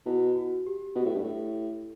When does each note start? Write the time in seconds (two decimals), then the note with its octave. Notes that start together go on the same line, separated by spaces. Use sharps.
0.06 B2 E4
0.35 F#4
0.66 G4
0.95 B2
1.05 A2
1.15 G2
1.24 A2